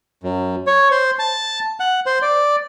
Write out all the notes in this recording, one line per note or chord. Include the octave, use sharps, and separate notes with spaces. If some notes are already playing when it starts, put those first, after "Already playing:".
F#2
C#5
C5
A5
F#5
C5
D5